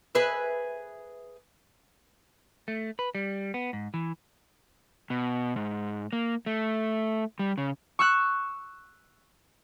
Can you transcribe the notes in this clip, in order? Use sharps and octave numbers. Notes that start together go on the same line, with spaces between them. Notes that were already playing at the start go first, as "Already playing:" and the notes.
G#4 B4 E5
A3
B4
G3
B3
G#2
E3
B2
G#2
A#3
A3
G3
C#3
C#6 E6 F#6